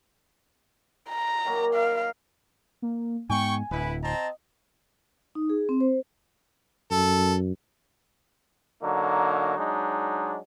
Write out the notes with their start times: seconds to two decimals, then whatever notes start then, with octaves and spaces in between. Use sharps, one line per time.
1.09 A#5
1.45 D#3 F#3 A#3
1.74 A#4 F5
2.82 A#3
3.29 G#2 G#3 B3 G5 G#5 C#6
3.71 D1 E4 B4
4.02 C4 D#5 A5 A#5
5.35 D#4
5.50 G#4
5.69 C4
5.81 C5
6.91 F#2 A4
8.82 D3 F#3 A#3 D#4
9.58 F#3 G#3 D4 D#4